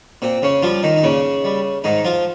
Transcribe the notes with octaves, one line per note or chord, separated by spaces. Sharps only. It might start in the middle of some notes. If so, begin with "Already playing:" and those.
A#2 C4
C#3 C#4
F3 G3 F4
D#3 D#4
D#4
A#2 C#3 C#4
G3
G#2 D#3 D#4
F3 F4